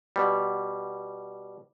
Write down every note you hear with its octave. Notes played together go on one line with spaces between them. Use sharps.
B2 G3